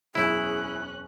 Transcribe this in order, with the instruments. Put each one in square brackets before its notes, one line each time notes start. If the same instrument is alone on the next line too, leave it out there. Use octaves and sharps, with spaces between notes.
[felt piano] E1 F#2 G6 [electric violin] C#4 F#6 [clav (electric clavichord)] E4 [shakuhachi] G#4